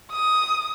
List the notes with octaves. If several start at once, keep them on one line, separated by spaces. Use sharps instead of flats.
D#6